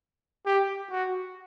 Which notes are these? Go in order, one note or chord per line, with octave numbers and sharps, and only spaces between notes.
G4
F#4